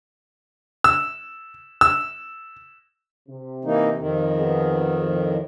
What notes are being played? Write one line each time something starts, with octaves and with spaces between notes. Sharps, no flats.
E6
E6
C3
E3 A#3 D#4
F2 D#3
B3 D#4 G#4
A2 F3